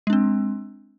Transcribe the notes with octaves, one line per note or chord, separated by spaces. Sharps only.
G#3 C4 D4